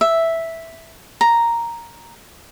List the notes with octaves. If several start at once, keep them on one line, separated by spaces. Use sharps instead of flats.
E5
A#5